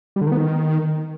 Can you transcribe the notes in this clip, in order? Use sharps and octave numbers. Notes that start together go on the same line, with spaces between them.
G3
D3
D#3
B3
D#3